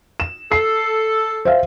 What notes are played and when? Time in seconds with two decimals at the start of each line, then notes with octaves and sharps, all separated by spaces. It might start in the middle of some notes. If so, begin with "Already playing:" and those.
0.20 E7
0.52 A4 C7
1.45 C5 E5 F5